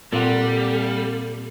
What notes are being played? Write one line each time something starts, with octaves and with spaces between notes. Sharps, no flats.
A#2 G3 C4 A4 F5 F#5